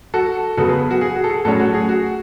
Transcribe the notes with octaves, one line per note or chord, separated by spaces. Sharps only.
F#4 A4
C#3 F#3 B3 F#4 A4
G#4 B4
F#4
G#4
F#4
A4
G#4
A2 F#3 C#4 F#4 A4
F#4
G#4
F#4